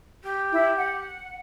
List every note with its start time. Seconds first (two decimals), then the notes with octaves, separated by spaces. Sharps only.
0.23 G4
0.52 E4
0.77 F#5